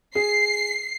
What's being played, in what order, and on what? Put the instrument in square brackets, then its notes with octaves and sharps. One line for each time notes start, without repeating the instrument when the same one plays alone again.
[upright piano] G#4 [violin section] C7